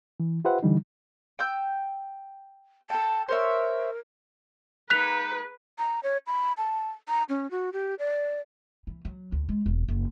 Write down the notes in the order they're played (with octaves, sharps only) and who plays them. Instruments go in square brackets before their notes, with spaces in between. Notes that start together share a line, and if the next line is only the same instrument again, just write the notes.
[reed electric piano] E3
F4 G4 B4 C5 E5 F#5
D3 E3 G3 D#4
[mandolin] G5 E6 G6
[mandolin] A4 G5 [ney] A5
[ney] A#4 [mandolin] C5 C#5 E5
[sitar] G#3 A#3 D#4 [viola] B4 [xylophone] F#6 B6 F7
[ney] A#5
C#5
B5
A5
A#5
C#4
F#4
G4
D5
[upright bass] E3
F#3
D2
G#3
E1
F#1